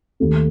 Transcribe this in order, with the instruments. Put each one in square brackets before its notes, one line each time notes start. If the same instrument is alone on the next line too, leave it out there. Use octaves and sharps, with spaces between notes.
[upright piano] D#2 D#3 A3